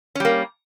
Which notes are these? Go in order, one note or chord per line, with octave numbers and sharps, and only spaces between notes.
G3 A#3 C#4